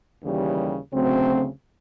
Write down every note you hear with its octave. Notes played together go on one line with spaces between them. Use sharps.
D#2 C#3 E3 G3
D2 C#3 F#3 A3 C4